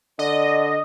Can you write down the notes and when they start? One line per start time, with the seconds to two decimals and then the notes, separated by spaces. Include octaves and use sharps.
0.19 D3 D5 D#5